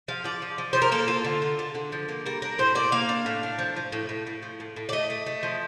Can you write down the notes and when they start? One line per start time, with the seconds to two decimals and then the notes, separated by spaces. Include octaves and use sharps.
0.08 F3 F5
0.24 F3 D5
0.42 F3
0.58 F3
0.73 F3 C5
0.82 A#4
0.92 A#3 A4
1.08 F4
1.24 D3
1.42 F4
1.59 D3
1.75 D3
1.92 F3
2.09 A#3
2.26 G3 A#4
2.42 D4 A#4
2.58 A2 C5
2.75 A#3 D5
2.92 A#3 F5
3.09 D4
3.26 A2
3.43 D4
3.59 F3
3.76 F3
3.92 A2
4.09 A2
4.27 A2
4.42 F3
4.60 A2
4.76 A2
4.89 D5
4.92 A3 D#5
5.10 A3
5.26 A3
5.43 F3